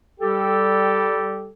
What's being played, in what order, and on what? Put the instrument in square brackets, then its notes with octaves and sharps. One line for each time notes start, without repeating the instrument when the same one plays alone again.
[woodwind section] G3 G4 A4